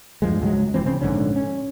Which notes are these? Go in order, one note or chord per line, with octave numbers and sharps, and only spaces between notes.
E2 G2 F3 G#3
C#2 G#2 F#3 G#3
D#1 E3 C4
C#3 C4
A#1 G#2 D3 C#4
C#4